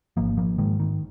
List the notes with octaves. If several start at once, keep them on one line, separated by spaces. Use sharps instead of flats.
G#1 F3 A#3
F3 A#3
G#2 D#3 G#3
D#3